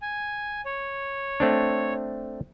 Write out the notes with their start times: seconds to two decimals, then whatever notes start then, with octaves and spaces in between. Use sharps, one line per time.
0.02 G#5
0.65 C#5
1.40 A3 C4 D4